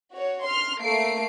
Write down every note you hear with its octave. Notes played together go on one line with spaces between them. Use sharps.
F#4 C#5
C6 F6
A3 A#3 C7 D7